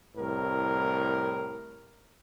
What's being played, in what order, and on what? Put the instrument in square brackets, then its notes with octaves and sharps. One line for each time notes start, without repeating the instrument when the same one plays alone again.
[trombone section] C2 A2 A#4